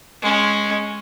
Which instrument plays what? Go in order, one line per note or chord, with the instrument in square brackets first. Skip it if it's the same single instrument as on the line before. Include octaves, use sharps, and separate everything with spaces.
[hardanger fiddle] G#3 C#4